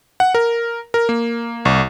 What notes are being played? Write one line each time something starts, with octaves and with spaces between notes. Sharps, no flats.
F#5
A#4
A#4
A#3
C2